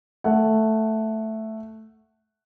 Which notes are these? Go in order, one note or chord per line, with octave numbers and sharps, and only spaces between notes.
A3 F#5